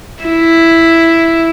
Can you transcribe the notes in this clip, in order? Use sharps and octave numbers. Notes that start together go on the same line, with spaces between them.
E4